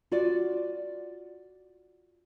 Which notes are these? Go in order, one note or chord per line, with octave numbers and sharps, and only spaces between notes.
F4 F#4 D5